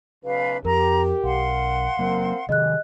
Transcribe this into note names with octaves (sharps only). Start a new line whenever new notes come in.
B1 C#3 B4 F5
F2 G4 A#4 A#5
B1 F5 F#5 C6
F#3 A#3 C4 A#4
C3 D#3 G3 G#4 D#5 F#6